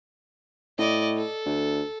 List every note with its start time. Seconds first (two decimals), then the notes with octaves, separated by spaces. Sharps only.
0.78 A2 D5 D#5
1.16 A4
1.46 D2